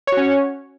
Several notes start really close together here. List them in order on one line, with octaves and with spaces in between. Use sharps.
C#5 F#4 C#4